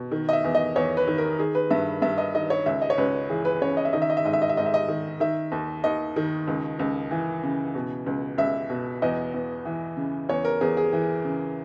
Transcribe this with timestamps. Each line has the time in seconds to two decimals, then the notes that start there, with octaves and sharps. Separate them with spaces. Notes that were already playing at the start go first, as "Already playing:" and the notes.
Already playing: B2
0.11 D#3
0.29 D#5
0.33 E5
0.44 E2
0.55 D#5
0.76 E2 C#5
0.97 B4
1.07 D#3
1.18 A#4
1.39 D#3 G#4
1.55 B4
1.70 G2 E5
2.02 G2 E5
2.18 D#5
2.34 D#3 D#5
2.50 C#5
2.66 C#2 E5
2.82 D#5
2.90 C#5
2.98 C#2 B4
3.29 E3 G#4
3.45 B4
3.61 C#3 C#5
3.77 D#5
3.85 E5
3.93 D#3 D#5
4.02 E5
4.10 D#5
4.17 E5
4.24 G#2 D#5
4.33 E5
4.42 D#5
4.49 E5
4.57 G#2 D#5
4.66 E5
4.74 D#5
4.88 D#3
5.20 D#3 E5
5.52 D#2
5.84 D#2 D#5
6.16 D#3
6.47 C#2
6.79 C#2
7.11 E3
7.43 C#3
7.75 B2
8.06 C#2
8.38 C#2 E5
8.70 B2
9.02 E2 D#5
9.34 E2
9.65 E3
9.97 C#3
10.29 E2 C#5
10.45 A#4
10.61 E2 G#4
10.77 G#4
10.93 E3
11.25 C#3